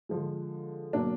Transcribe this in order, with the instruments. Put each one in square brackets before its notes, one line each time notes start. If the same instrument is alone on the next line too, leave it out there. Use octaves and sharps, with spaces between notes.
[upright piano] D3 F3 G#3
B2 F#3 A#3 D4